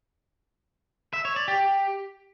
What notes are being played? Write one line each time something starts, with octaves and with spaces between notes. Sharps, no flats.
E5
C#5
D5
G4